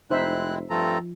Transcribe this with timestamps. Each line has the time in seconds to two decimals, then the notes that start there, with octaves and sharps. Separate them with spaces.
0.10 F1 G#3 C4 D#4 E4 C5 E5 F#6
0.70 G2 F3 A3 C4 F4 A4 A#5